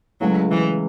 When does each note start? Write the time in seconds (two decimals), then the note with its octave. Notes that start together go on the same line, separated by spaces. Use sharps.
0.21 C#2 C#3 F#3 A3 C#4 E4
0.51 E3